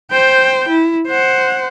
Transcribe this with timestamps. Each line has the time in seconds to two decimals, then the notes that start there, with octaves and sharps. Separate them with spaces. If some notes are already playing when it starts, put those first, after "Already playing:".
0.11 C5 G5
0.68 E4
1.07 C5 F#5